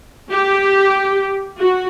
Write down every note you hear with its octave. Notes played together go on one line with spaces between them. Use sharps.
G4
F#4